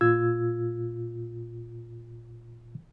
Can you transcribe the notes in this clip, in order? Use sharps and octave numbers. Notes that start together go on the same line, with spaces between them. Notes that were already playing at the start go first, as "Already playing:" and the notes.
A#2 F4 E6 G#6